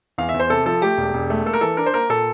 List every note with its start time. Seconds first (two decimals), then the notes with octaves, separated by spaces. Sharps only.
0.18 E2 F5
0.29 E5
0.34 E2
0.40 C5
0.50 C3 A4
0.66 F3 A4
0.82 A3 G4
0.98 E1
1.14 E1
1.30 A3
1.46 A#3 A4
1.54 A#4
1.61 E3 A4
1.77 D4 A#4
1.86 C5
1.94 A#3 A#4
2.09 A#2 A4